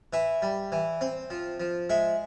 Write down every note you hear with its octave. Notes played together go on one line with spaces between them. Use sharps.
E3 E5
G3
E3
C4
F3
F3
G#3 E5